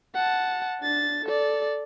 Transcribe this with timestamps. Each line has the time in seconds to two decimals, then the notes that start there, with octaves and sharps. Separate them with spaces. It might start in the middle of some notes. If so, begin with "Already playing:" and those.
0.15 F#5 A5
0.82 D4 A6
1.25 A4 D5